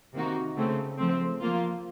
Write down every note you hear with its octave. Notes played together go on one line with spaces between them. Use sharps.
C3 D#3 A#3 D#4 F#4
C#3 A3 C4
F3 A3 C4
F3 A#3 F4